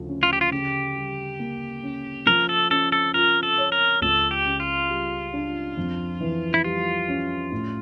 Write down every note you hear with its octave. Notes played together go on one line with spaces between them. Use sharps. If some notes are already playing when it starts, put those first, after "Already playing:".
Already playing: D2 C#3 F3
C#4
F4
G4
F4
C#3 G4
G3
A#3
C#4
F3 A#4
A4
C#4 A4
A4
F4 A#4
A4
C#5
A#4
C#2 A4
G4
C#3
F4
G3
D4
F2
E3
E4
G3 F4
C#4
A2